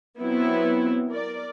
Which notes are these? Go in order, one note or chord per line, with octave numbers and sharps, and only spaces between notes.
F#3 B3 C4 E4
A#4 D5